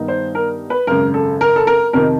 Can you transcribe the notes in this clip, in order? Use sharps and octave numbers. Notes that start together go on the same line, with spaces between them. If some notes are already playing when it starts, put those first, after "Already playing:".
Already playing: G2 D#3 G3 B3 D#4
C5
A#4
B4
G#1 F#2 C#3 A#4
A4
A#4
A4
A#4
F2 C3 D#3 A#4